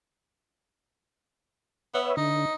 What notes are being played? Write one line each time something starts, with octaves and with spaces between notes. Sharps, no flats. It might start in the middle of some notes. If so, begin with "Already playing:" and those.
B3 B4 C#5 E5
D3 D#4